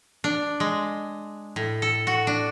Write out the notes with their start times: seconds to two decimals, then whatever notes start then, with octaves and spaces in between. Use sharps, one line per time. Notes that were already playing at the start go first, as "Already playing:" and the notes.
0.24 D4
0.60 G#3
1.56 A2
1.82 A4
2.07 F#4
2.27 D4